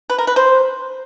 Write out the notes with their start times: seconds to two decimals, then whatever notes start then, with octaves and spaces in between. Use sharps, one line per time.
0.10 B4
0.18 A#4
0.27 B4
0.36 C5